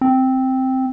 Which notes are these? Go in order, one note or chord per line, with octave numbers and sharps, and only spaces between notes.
C4